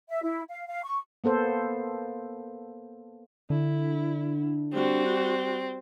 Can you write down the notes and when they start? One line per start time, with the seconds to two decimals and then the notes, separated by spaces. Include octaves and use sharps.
0.10 E5
0.23 E4
0.49 F5
0.67 F5
0.84 C#6
1.24 A#3 B3 A4 C5
3.50 D3 E4
4.73 G3 C4 F#4